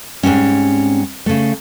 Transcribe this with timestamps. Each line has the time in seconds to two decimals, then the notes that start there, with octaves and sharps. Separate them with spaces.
0.23 G#2 F#3 G3 C4 C#4
1.26 C#3 A3